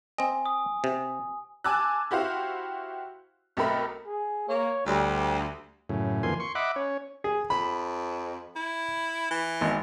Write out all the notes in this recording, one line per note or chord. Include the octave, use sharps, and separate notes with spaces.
C4 D#5 G#5
D#6
C3
G#5 A5 D6 E6 F#6
E4 F#4 G4 C5 F5
B1 A3 C4 A#4 B5
G#4
A#3 C#5
D2 G3
F#2 A2 C#3
F2 D3 E3 A#3 G#5 C6
C6 C#6
D#5 E5 F#5 B5 D6
C#4 C#5
G#4
F2 B5
E4
E3
G#1